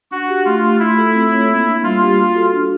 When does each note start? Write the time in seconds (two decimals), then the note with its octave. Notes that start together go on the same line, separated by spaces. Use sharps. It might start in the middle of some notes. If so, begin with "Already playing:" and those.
0.11 D4 F#4
0.29 G4
0.45 A3 F4
0.62 A3
0.79 E4 F4
0.97 A4
1.14 C4
1.31 C#5
1.49 A#3
1.66 D4
1.83 G3 F4
2.01 G4
2.18 F#4
2.35 A4
2.53 D4